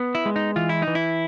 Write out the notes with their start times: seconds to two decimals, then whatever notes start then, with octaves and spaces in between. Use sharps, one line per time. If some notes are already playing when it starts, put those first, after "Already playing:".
Already playing: B3
0.15 E4
0.26 G#3
0.36 D#4
0.56 E3 F4
0.69 E4
0.82 D#4
0.87 E3
0.95 E4